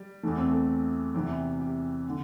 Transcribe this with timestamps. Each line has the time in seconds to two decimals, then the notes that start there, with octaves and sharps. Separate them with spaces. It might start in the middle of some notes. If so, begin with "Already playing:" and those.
Already playing: G3
0.23 E2 E3 A3
0.37 C4
0.50 A3
1.14 E2 C3 E3 G4
1.60 G4
2.08 D3